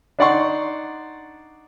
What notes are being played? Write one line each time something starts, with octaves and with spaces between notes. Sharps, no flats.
D4 D#4 D5 F#5 C6 C#6